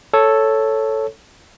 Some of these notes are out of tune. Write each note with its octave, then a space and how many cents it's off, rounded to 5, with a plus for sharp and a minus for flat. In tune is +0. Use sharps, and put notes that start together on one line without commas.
A4 +0 C#5 +0